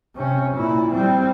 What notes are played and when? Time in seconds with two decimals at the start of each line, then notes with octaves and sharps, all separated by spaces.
0.16 C3 C#4
0.54 A#2 E4
0.92 G3 C4